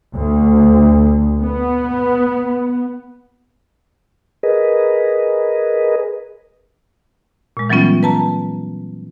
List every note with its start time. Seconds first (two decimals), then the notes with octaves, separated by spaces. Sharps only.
0.15 D2
1.43 B3
4.43 G#4 A#4 B4 D#5
7.57 A#2 G#3
7.70 E3 F#3 G3 B3 C#4 F4
8.03 B4 A5 A#5